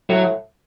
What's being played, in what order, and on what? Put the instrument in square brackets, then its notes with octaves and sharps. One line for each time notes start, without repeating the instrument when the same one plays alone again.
[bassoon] A2 [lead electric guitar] F#3